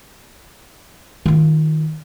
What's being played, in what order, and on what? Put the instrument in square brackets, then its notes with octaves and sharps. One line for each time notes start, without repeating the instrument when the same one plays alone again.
[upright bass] D#3 F4